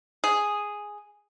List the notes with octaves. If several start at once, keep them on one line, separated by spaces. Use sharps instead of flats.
G#4